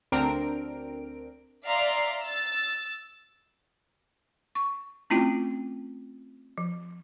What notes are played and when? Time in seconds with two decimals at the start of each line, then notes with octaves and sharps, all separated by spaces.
0.12 D2 C4 D4 A#4 D7
1.64 D5 E5 F5 A#5 C6
2.23 E6 A6
4.55 C#6
5.10 A3 C4 C#4 E4 F4 G5
6.58 F3